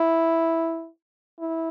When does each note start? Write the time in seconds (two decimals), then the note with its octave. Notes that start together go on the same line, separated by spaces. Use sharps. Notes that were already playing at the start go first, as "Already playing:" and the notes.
Already playing: E4
1.40 E4